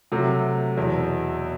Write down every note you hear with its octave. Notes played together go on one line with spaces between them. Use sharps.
C3 F#3 A3
E2 B2 F#3